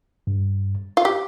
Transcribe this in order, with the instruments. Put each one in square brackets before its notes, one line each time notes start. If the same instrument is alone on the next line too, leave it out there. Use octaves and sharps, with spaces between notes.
[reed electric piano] G2
[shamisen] F4
G4